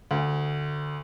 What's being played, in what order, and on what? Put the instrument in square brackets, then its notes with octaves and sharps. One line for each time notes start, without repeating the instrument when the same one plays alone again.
[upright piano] D2